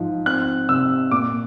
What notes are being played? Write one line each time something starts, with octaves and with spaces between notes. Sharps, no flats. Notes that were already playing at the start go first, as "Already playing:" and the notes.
Already playing: G#2 F3
C4 F#6
C3 E6
A#2 D6